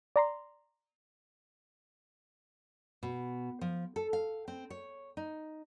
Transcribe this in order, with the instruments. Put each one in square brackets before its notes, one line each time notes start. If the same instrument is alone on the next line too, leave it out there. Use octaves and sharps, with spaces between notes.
[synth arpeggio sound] D5 A#5 C6
[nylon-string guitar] B2
F3
A4
F5
C4
C#5
D#4